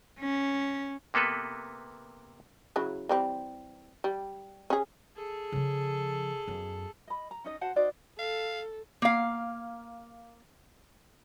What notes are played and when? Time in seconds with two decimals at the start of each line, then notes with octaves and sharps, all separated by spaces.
0.20 C#4
1.14 C3 A#3 B3 A4 B4
2.76 C#3 F#3 E4
3.09 E3 G3 C4
4.04 G3
4.70 C#4 G#4
5.16 G#4 A4
5.52 C#3 F3
6.48 F#2 B3
7.08 D#5 B5
7.31 A#5
7.44 C#4 D#4 D#5
7.61 F#4 C5 F#5 A5
7.76 D#4 F#4 C5 D5
8.19 A4 F5
9.02 A#3 F5